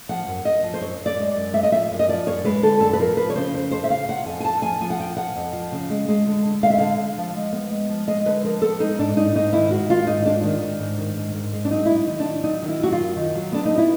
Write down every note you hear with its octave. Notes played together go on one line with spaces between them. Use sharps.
F3 F#5
F#2
F#2 D#5
F3
C5
F#2 C#5
F#2
D5
G#3
F#2
G#3 E5
D#5
F3 E5
F#2
D#5
F3 D5
F#2 C#5
G#3 B4
D3 A4
F#2 A4
B4
F3 A#4
F3 B4
C#5
C#3 C5
F2 C5
F2 C5
E5
C#3 F5
C#3 F#5
F2 G#5
G#5
F2 A5
F3 G#5
F3 G#5
F#5
F2 G5
F3 F#5
F2
F3
C#3
G#3
G#3
D3
D3
G#3 F5
E5
D3 F5
D3
F3
G#3
B3
G#3
F3
G#3 D#5
D3 B4
F3 A#4
B3 A4
G#3 D#4
G#2 D4
G#2 D#4
G#2 D#4
D#3 E4
G#3 F#4
D#3 F4
G#2 D#4
G#3 D4
D#3
D#3
G#2
D#3
G#2
G#2
G#3
D4
F#3 D#4
F#3 E4
D#4
D#3
D4
D#3
F#3 D#4
D#3
E4
F#3 F#4
F4
F#2
D#3
F#3
B3 D4
D#4
B3
E4